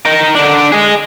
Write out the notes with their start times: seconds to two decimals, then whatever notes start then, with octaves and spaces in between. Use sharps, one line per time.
0.05 D#4 A#4
0.35 D3 D4
0.72 G#4 D#5